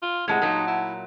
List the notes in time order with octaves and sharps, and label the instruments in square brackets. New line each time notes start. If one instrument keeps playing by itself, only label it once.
[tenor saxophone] F4
[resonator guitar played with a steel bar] A2 G#3 [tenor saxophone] C3 [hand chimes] F#5 A5 G#6
[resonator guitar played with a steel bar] A#2 F#3 [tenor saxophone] D#4
[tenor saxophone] E4